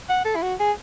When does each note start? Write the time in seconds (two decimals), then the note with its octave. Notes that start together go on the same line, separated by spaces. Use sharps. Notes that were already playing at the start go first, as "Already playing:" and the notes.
0.09 F#5
0.25 A4
0.36 E4
0.42 F#4
0.60 G#4